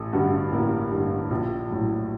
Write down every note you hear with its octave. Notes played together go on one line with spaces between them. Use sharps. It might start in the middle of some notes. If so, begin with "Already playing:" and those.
Already playing: A1 A4
G2 D3 F#4
A1 A#3
G2 D3
A#1
A2 F#3